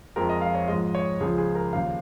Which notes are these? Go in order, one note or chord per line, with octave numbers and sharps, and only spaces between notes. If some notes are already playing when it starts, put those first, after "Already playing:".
F2 F3 G#3 A#4
D#5
F5
C#5
G#2 F3 G#3 D#5
C#5
C#2 C#3 F3 G#4
G#4
A#4
D#2 C#3 F3 F5